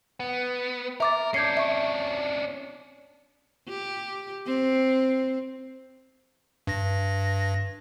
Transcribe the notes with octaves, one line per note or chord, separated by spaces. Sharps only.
B3
A#4 E5 D6 A6
C#4 D4 G6 G#6 C7
E5 C#6
G4
C4
G2 A#6